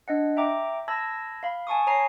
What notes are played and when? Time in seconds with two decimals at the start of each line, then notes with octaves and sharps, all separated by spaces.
0.08 D4 D#5 F#5
0.36 E5 G5 A#5 D6
0.88 A5 B5 E6 G#6 A#6
1.43 F5 B5
1.67 G#5 A5 C#6 D#6
1.87 C#5 G#5 A#5 D#6 C7